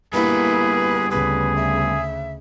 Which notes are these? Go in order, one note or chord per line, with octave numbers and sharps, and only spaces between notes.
G3 A#3 B3 E4 G#4 B4
D2 C#3 G#4 B4
E5